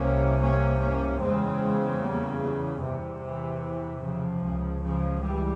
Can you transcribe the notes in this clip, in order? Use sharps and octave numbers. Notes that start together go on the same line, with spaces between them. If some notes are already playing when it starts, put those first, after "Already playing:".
Already playing: C2 C3 A#3 C#4
A#3 C#4
A#3 C#4
E2 C#3 G#3 C4
G3 A#3
E3 G3
E2 C3
E3
C#3 F3
C#2 C#3
C#3 F3
E3 G3